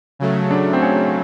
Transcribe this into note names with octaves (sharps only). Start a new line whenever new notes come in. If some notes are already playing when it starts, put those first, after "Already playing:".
C#3 F#3 A3
D4
C4
C#4